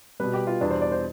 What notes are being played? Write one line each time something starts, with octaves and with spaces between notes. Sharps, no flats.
B2 G3 B4
G4
F4
E2 B2 G3 D4
C5
D5
C5